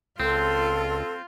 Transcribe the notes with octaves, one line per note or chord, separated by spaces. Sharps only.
C#2 C4 F4 A4